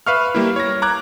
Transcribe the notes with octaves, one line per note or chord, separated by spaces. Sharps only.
B4 E5 F5 C#6 F6
G3 A#3 E4
C#5 A#6
A#5 D6 F#6 G#6